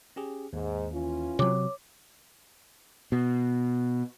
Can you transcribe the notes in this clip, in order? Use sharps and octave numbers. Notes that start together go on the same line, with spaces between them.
C#4 G4 G#4
D#2 G#2
E3 C#4 F4
C3 F#3 C#5 D6
B2